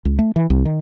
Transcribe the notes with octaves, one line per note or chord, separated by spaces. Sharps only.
C#2
A3
E3
C2
D#3